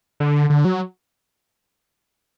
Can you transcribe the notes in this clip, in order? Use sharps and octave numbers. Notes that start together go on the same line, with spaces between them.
D3
D3
F#3